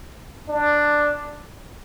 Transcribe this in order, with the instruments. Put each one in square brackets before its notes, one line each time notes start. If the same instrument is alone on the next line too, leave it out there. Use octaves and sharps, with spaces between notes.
[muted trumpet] D4